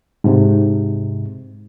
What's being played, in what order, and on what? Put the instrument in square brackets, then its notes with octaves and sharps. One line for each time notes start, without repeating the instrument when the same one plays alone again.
[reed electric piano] G#2 C3